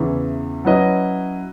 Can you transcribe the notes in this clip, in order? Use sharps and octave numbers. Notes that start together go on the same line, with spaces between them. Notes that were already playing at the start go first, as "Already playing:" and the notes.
Already playing: E2 C#3 E3
F#3 C#4 E4 B4 D#5